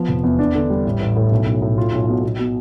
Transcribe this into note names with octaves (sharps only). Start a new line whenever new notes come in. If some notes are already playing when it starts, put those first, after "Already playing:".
Already playing: F3 B3
F1
E2
D4
D3
G3
A1
A1
A2
B1
B1
A2
F4
B1
B2
B2
B2